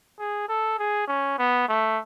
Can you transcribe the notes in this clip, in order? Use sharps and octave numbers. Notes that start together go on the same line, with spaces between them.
G#4
A4
G#4
C#4
B3
A3